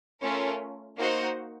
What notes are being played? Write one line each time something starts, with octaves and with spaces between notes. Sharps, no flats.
A3 C#4 F4 A#4
A#3 D#4 F#4 C5 F#5